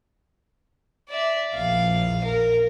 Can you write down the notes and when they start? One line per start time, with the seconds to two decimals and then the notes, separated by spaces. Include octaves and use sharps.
1.09 D5 E5
1.54 A#1 E2 F5
2.24 A#4